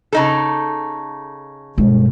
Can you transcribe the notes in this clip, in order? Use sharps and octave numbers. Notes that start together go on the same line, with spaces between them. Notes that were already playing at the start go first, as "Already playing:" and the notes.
C#3 D#4 A4
G2 B2 G#3